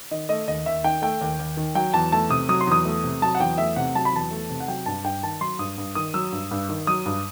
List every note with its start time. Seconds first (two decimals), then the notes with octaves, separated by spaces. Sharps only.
0.11 D#3 D#5
0.29 A3 D#5
0.48 D#2 D#5
0.66 D#2 E5
0.84 D#3 G5
1.02 A3 G5
1.21 D#2
1.39 D#2
1.57 D#3
1.75 F#3 G5
1.94 E2 A5
2.12 A3 A5
2.30 C3 D#6
2.49 F#3 D#6
2.61 C6
2.67 E2 D#6
2.85 A3
3.04 C3
3.22 F#3 A5
3.35 F#5
3.40 E2 G5
3.58 A3 E5
3.76 C3 F#5
3.95 F#3 A5
4.05 B5
4.13 E2 A5
4.31 A3
4.50 C3
4.60 F#5
4.68 F#3 G5
4.86 G2 A5
5.04 G2 G5
5.23 D#3 A5
5.41 F#3 C6
5.59 G2 D#6
5.78 G2
5.95 D#3 D#6
6.14 F#3 E6
6.32 G2
6.51 G2
6.69 D#3
6.87 F#3 D#6
7.06 G2